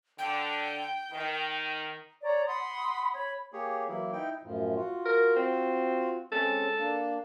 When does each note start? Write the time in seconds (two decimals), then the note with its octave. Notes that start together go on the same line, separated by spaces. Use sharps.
0.19 D3 G5
1.12 D#3
2.21 C#5 D5 A#5
2.46 F#5 B5 C6 D#6
3.13 C#5 B5
3.53 A#3 G4 G#4 C#5
3.88 E3 F#3 A#3 E4
4.12 D#4 E4 G5
4.43 F#2 A2 F3
4.75 F4 F#4
5.06 A#4
5.36 C4
6.32 G#3 C4 C#4 A4
6.78 A#3 D4 A5